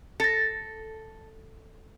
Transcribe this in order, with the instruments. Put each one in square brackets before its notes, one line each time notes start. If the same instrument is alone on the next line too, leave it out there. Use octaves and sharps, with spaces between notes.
[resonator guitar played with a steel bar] A4 [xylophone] A6 A#6